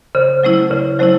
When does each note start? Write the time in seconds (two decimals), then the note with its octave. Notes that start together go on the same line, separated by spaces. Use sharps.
0.15 C#3 C5
0.44 F#3 A3 C#4 E4
0.70 C#3 B4
0.99 F#3 A3 C#4 E4 C5